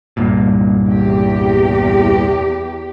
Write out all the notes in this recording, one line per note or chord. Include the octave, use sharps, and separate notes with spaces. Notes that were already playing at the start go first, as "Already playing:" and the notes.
C2 G2 A#2
E2 G4